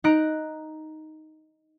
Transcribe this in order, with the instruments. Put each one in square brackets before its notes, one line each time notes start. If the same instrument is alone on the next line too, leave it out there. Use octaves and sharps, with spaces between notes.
[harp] D#4 A#5 F#6 A#6 D7